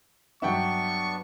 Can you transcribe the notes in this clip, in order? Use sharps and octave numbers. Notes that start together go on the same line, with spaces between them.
G2 F#3 B3 D4 E5 F#5 G5 C#6